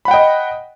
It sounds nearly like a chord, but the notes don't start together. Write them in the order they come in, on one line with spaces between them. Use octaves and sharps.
B5 F#5 G5 D#5